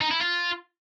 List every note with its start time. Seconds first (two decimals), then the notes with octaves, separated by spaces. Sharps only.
0.01 D#4
0.11 E4
0.21 F4